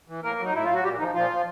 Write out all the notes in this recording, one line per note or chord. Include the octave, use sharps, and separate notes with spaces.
E3
A2 A#3 A#4
F#3 D#4
A2 E4
F#3 F4
F#4
A#2 G3 G4
D#3 F3 D#4
A#2 F3 F4
F3